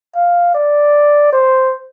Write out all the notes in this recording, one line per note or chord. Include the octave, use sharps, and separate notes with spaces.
F5
D5
C5